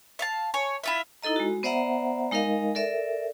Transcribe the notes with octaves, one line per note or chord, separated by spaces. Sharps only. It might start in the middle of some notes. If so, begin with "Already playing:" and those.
E5 F5 A5
C#5 G#5
E4 F4 E5
D#4 E4 A4 D#5 A#5
G#3 F#4
B3 C5 D5 E5 F#5 A#5
G#3 D#4 A#4 D#5 F5
A4 A#4 D5 E5